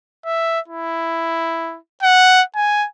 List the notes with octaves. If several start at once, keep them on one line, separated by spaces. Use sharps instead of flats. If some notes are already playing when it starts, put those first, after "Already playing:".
E5
E4
F#5
G#5